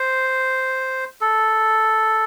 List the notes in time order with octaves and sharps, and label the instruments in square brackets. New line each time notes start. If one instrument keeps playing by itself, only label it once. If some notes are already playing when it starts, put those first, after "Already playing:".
Already playing: [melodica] C5
A4